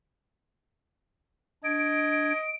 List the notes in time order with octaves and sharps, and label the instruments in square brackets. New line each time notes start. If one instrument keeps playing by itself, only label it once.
[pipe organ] D4 G#6 [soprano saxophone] D#5 [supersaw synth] D7